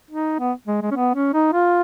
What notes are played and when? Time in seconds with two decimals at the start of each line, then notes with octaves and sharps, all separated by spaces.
0.11 D#4
0.40 B3
0.68 G#3
0.82 G#3
0.91 C#4
0.96 B3
1.15 C#4
1.34 D#4
1.53 F4